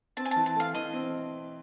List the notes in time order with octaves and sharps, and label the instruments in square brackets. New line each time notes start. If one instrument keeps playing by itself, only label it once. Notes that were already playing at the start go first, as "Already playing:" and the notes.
[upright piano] C4 [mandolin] A5
[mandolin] G#5
[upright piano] E3 [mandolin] A5
[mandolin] A5
[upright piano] A3 [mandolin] F5
[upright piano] E3 [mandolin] D#5
[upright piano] C4